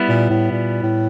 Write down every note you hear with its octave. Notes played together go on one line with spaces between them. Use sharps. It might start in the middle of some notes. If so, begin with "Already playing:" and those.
Already playing: G3 B3 E4
A#2
A2
A#2
A2